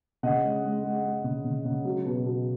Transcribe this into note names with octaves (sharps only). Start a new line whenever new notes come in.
C#3 D#5 F#5
G#3
G#3
G#3
G#3
C#3
C#3
C#3
F#3
B2
B2